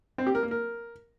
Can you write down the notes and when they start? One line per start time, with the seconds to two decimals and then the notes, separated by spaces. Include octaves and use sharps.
0.18 C4
0.27 G4
0.35 A#4
0.43 A#3
0.51 A#4